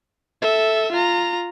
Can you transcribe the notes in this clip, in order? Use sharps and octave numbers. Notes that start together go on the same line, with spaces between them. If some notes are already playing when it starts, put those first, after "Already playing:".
A4 E5
F4 A#5